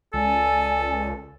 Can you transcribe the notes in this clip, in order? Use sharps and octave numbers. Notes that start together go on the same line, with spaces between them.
C#2 A4 D5 G#5